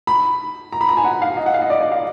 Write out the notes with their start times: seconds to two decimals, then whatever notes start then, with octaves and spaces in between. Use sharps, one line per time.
0.07 B5
0.72 A#5
0.81 B5
0.89 A#5
0.97 G#5
1.05 F#5
1.22 F5
1.37 D#5
1.46 F#5
1.54 F5
1.62 D#5
1.70 D5
1.81 D5
1.92 F5